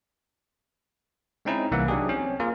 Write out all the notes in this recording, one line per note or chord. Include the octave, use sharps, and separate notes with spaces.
G#3 C4 C#4 D#4 E4 D#5
C2 E3 A#3 E5 F#5
F#3 D4 D#4 G4 G#4
C4 C#4
A#3 F4 G#4 A#4